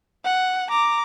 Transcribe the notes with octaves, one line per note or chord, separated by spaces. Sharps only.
F#5
A#5 D6